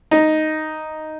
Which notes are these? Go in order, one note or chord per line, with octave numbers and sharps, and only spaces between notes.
D#4